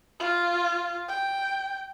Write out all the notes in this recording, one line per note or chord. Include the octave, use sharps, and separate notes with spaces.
F4
G5